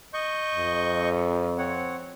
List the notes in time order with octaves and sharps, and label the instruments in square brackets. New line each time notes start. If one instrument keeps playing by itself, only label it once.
[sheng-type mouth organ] D#5 C#6 G6
[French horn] F2
[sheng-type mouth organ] C4 C#5 F#5